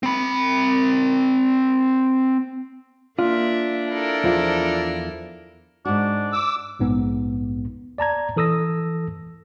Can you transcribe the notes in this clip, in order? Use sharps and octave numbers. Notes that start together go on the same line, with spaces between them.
C4 B5
A#3 D4 F4 E5
E4 A4 A#4
E2 F3 F4
G#2 D4 F#4
D6 E6
A#1 G#2 B3
D5 A5 A#5 G#6
E3 A4 D#6 E6 A#6